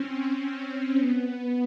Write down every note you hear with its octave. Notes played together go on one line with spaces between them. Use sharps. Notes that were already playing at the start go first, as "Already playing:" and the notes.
Already playing: C4 C#4
B3